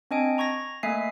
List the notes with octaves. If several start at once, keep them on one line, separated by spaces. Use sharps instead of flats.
C4 D4 D#5 G#5 D7
A#5 C#6 G#6 A#6
A3 A#3 D#5 E5 G#5 C7